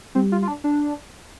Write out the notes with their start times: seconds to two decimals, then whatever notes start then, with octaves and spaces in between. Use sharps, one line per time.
0.15 G3 C4
0.32 F4
0.42 F4
0.48 D4
0.64 D4